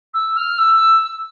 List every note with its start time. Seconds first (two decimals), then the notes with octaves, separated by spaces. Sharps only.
0.14 E6
0.36 F6
0.58 E6